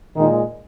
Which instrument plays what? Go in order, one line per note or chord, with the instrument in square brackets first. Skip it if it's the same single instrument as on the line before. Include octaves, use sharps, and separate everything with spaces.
[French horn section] A#2 D#3 G#3 D#4